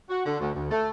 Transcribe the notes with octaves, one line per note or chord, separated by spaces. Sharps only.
F#4
D3
D2
D2
A3